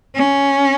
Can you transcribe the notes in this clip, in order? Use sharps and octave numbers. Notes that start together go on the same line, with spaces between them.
C#4